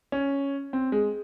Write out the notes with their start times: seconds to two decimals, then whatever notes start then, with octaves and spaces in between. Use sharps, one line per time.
0.12 C#4
0.73 C4
0.92 G#3